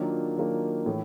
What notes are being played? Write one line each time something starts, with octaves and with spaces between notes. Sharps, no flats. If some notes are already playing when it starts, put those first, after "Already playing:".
Already playing: D#3 F#3 A#3 D4 F4
D#3 F#3 A#3 D4 F4
A2 E3 A3